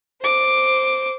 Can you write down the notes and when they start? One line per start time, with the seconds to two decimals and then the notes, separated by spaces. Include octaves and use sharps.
0.21 C5 D6